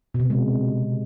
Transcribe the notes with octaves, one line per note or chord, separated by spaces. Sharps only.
B2
C3
C#3
G#3